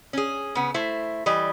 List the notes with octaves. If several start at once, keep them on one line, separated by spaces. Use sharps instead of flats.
C#4 G#4
C#3 B3
A3 E4 C5
E3 G3 D#5